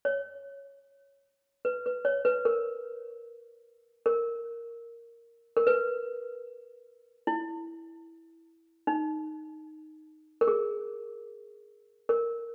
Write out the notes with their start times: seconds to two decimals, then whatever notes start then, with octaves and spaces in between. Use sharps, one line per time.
0.05 C#5
1.65 B4
1.86 B4
2.05 C#5
2.25 B4
2.45 A#4
4.06 A#4
5.57 A#4
5.67 B4
7.27 E4
8.87 D#4
10.41 A#4
10.47 G#4
12.09 A#4